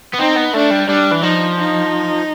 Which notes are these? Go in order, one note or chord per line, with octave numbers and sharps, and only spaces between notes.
B3
C4 D#4
B3
A3 D4
G3
G3 D4
E3
F3 D#4
D#4